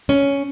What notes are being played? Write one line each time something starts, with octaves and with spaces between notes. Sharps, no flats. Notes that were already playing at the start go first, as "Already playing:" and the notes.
C#4